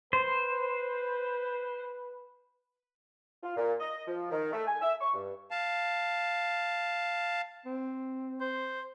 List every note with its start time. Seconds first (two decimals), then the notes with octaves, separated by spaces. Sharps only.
0.13 B4 C5
3.43 F4
3.57 A#2
3.80 D#5
4.08 F3
4.31 D#3
4.52 A3
4.67 G#5
4.81 E5
5.01 C#6
5.13 G2
5.51 F5 A5
7.66 C4
8.40 C5